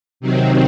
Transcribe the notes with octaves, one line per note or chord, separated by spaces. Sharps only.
C3 D#3 F#3 C4